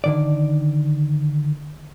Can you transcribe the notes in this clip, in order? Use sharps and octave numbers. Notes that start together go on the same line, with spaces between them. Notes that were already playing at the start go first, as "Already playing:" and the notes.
D3 D#3 D5